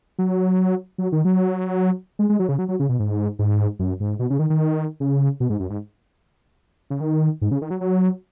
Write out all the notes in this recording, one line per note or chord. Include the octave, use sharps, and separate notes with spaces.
F#3
F#3
D#3
F#3
G#3
G#3
F#3
C#3
F#3
F#3
C#3
B2
G#2
G#2
F#2
G#2
B2
C#3
D#3
D#3
C#3
B2
G#2
F#2
G#2
C#3
D#3
G#2
C#3
D#3
F#3
F#3